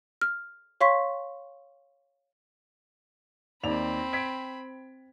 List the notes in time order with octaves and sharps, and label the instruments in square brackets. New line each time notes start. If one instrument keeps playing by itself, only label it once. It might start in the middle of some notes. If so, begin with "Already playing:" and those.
[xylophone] F6
C#5 F5 C6 C#6 B6
[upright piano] D#2 D5 F7 [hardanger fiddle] C4 B5
[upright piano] G#6 B6 D7